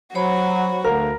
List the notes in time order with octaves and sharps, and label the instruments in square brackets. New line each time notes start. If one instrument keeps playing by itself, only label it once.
[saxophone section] F#3 [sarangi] F#4 [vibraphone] C5 C#5 B5
[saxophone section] D2 [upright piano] A#4 [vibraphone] F5